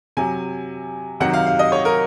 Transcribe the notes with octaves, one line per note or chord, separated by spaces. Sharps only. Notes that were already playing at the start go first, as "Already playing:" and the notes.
C3 F#3 G#5
C3 D#3 F#3 F#5
F5
F5
D#5
C#5
A#4